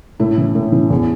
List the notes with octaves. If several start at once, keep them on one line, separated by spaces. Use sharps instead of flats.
A2 E4
E3
A2
E3
E2